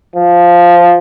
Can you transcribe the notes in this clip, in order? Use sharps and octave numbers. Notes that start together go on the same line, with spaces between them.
F3